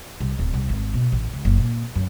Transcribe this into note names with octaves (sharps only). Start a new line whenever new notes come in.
C2
D1
C2
G#1
B2
A1
C#2
F#1
A#2
F#2